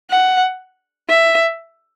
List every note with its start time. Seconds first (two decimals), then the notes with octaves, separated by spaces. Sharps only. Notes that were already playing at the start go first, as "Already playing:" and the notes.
0.10 F#5
1.08 E5